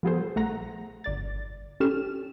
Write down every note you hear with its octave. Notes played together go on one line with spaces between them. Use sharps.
F3 G3 B3 G#4 A4 C5
A#1 A3 F#5 A#5 A#6
G1 D5 A6
C#4 G4 A4 F6 E7